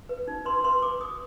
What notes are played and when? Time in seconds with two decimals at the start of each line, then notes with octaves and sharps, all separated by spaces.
0.09 B4
0.28 D#4
0.45 B4 C6
0.64 B4 C6
0.82 B4 D6
1.00 B4 D#6